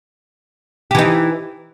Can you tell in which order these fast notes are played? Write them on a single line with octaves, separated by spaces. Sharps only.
G4 E3 D#4